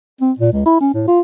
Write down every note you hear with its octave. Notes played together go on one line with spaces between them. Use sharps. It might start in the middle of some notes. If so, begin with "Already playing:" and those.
C4
A#2
C#2
E4
C#4
A2
F4